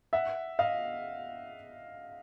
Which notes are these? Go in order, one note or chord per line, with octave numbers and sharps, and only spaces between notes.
E5 F#5
D#5 F5